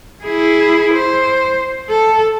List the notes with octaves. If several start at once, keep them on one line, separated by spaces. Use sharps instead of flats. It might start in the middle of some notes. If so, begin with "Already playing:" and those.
E4 G#4
C5
A4